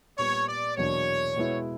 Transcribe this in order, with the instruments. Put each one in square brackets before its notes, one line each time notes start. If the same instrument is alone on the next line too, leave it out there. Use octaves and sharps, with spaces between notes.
[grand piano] A#2 G3 B3 [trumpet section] C#5
[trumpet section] D5
[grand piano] E2 B2 F#3 A#3 D4 [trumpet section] C#5
[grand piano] B2 G#3 B3 E4